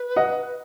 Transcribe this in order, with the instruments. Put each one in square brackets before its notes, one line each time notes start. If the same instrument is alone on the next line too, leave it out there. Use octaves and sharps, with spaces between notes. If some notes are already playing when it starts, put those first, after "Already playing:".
Already playing: [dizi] B4
[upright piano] D#5 F#5